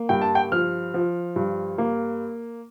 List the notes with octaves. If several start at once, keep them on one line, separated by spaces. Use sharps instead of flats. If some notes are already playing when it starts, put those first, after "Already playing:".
Already playing: A#3
G2 G5
A5
G5
F3 F6
F3
G2
A#3